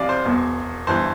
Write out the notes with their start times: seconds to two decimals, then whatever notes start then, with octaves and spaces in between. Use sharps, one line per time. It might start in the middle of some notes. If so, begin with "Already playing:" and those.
Already playing: C2 C3 E3 D5 F5
0.09 C5
0.25 E1 E2 B2
0.87 G1 G2 E3 C5